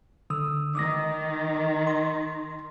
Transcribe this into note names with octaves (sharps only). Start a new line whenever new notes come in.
D3 D#6 E6
D#3 D6 D#6 A#6
C6